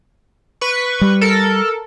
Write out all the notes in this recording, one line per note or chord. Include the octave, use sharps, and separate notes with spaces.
B4 C#6
G3
A4 A#4